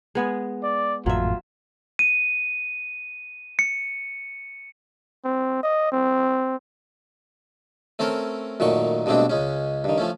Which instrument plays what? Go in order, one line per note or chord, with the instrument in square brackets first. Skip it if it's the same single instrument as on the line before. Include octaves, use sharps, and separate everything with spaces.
[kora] G#3 B3 G#4
[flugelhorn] D5
[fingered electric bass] G#1 F2 A2 [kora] F#3 E5 [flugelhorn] F4
[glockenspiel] D#7
C#7
[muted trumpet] C4
D#5
C4
[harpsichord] A3 C4 C#4 A4 A#4
F#2 A#2 D#3 A3 C#6
G2 B2 G#3 A3 C4 D4
C#2 G#3 C#4
G2 D#3
F3 A3 C#4